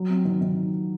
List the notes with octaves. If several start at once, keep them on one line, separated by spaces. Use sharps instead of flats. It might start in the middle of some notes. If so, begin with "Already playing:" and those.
Already playing: F#3
C4
D#3
D#3